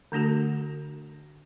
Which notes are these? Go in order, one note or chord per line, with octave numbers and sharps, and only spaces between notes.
D3 A3 D4 F#4 A4